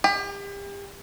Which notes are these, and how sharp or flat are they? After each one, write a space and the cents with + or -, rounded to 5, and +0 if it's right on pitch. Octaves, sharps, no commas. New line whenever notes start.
G4 +35